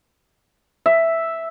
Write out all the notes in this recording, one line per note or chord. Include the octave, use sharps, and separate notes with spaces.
E5